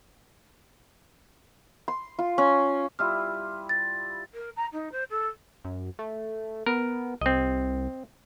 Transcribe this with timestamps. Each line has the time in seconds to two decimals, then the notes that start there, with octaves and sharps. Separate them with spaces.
1.88 C6
2.19 F4
2.38 C#4
2.99 G3 E4 F4 F6
3.69 A6
4.34 A#4
4.56 A#5
4.72 D#4
4.91 C5
5.10 A4
5.64 F#2
5.99 A3
6.66 B3 A#4
7.21 C2 C4 D#5